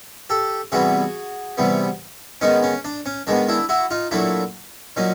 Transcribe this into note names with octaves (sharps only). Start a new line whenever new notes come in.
G4 A4
C3 E3 G3 B3 F#4 G#4
C3 E3 G3 B3
D#3 G#3 B3 C#4 D#4
C#4
D4
C#4
D#3 G#3 B3 D4
D4 E4
E4 F#4
D#4 F4
A#2 F#3 A3 D4 E4
A#2 F#3 C#4 D#4